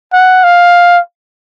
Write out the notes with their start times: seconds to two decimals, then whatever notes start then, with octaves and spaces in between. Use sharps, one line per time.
0.13 F#5
0.44 F5